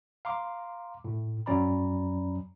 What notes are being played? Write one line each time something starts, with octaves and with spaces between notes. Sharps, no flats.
F5 A#5 C6 D6
A2
F#2 F#3 C#4 D5 A#5 B5